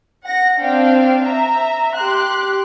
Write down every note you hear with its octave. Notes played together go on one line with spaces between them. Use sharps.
F#5 A#6
C4 D4 F5 G5
E5 A#5
G4 C6 F#6